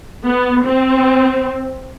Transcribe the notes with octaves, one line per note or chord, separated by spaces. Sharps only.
B3
C4